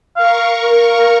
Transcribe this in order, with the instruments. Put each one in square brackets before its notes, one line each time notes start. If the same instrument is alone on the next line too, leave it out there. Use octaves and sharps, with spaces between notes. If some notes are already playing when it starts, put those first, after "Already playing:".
[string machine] A#4 C#6 [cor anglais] F5